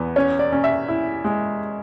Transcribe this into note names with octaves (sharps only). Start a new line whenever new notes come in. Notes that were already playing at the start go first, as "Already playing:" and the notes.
Already playing: E2 B3
C#4 C#5
D5
C#4
E5
E4
G#3